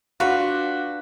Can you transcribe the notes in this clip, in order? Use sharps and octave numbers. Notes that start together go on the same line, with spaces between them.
D4 F4 F#4 B4